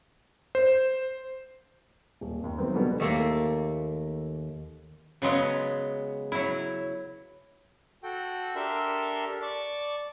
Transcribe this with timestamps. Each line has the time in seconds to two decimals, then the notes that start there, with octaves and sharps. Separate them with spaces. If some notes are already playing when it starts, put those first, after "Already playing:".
0.55 C5
2.21 D#1
2.44 D#2
2.58 D#3 F#3 A3 B3 C4
2.75 B2 D3 G3 B3
3.00 D#2 A3 A#3
5.22 C#3 F#3 G#3 B3
6.32 F#3 E4
8.03 F#4 A4 G5
8.56 D4 G4 A4 A#4 E5 C6
9.42 D5 A5 C#6